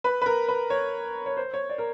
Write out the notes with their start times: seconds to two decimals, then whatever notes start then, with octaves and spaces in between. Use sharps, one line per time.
0.04 B4
0.22 B4
0.26 A#4
0.48 B4
0.70 C#5
1.26 C#5
1.37 C5
1.54 C#5
1.70 D5
1.78 A#4